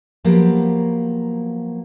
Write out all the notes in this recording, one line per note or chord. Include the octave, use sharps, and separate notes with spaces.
F3 F#3 A#3 B3 G4 A#4